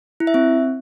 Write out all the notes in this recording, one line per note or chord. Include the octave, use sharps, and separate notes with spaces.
E4
E5
C4